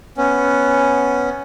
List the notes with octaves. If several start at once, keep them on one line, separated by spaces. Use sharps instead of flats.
B3 C#4